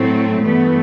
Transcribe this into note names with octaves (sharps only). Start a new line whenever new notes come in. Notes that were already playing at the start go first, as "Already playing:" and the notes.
Already playing: A2 F#3 A3 C4
G2 E3 A3 B3